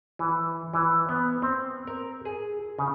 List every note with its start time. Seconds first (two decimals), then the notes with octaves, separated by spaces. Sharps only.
0.19 E3
0.74 E3
1.09 B3
1.42 C4
1.87 A#4
2.25 G#4
2.79 C#3